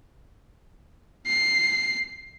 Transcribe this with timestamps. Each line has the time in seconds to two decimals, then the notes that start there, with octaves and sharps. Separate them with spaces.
1.27 C7